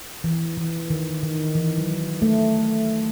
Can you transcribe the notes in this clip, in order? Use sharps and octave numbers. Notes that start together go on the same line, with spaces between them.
E3
E3
D#3
D#3
E3
F#3
A3